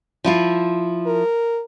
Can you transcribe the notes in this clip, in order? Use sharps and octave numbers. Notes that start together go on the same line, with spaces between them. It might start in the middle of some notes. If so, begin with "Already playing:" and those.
F3 E4 F4
A#4